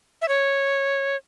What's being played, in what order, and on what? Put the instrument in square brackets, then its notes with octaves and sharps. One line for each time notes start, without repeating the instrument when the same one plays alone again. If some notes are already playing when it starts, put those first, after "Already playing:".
[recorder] E5
C#5